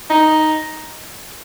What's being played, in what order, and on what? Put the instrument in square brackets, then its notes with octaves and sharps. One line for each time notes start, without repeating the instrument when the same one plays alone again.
[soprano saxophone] D#4